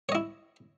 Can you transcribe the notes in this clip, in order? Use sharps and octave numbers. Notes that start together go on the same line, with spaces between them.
E4 C#5 D#5